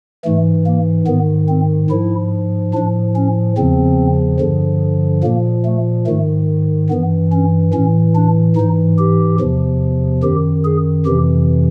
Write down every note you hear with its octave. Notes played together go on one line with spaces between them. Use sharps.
G#2 E3 A3
A#3
G#2 D#3 B3
C4
G#2 F3 E4
A2 F3 D4
C#4
E2 C#3 F3 C4
G2 D3 F3
A#2 F3 A#3
A3
G#2 D#3 A3
G2 E3 B3
C#4
A2 E3 C#4
D4
G#2 E3 D#4
G4
E2 C3 F3
F#2 D#3 G4
G#4
F2 C3 E3 G4